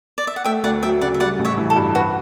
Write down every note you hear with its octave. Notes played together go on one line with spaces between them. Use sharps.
D5
E5
F#5
A3 E5 G5
D2 D5 F#5
F#3 E5 G5
C#3 D5 F#5
E5
G3 D5 F#5
A1
C#5 E5
E3
A4
G2
F#4 B4